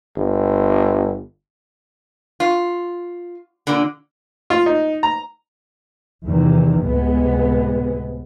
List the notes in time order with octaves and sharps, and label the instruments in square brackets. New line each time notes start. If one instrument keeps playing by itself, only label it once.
[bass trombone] G1
[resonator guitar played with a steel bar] F4
A#2 D3
[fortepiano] F4
D#4
A#5
[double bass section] E2 C3 D#3 E3
C#2 A2 C3 G#3 B3